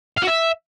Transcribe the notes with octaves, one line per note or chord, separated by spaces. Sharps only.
F5
F#4
E5